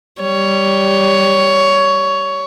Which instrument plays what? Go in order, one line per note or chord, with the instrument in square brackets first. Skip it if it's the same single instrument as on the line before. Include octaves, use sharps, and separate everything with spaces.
[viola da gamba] G3 [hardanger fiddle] C#5